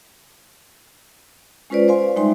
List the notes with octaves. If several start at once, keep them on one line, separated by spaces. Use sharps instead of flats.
G#3 C#4 F4 B4 C5 D5
C5 D5 F5 G#5 C6
G3 G#3 D#4 E5 G#5 C6